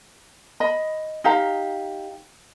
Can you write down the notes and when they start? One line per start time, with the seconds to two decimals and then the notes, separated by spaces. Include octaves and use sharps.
0.60 D#5 B5
1.24 D#4 G4 F5 A#5